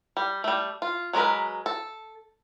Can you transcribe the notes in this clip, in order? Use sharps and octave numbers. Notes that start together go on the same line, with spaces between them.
G3
G3 A3
F4
F#3 G#3 D4 A#4 B4
A4